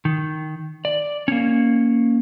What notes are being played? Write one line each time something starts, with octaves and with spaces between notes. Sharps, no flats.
D#3
D5
A#3 C#4